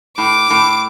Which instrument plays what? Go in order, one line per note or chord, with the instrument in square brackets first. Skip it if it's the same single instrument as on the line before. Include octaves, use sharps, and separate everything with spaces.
[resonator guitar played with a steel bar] A2 [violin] D6
[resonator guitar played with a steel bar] A2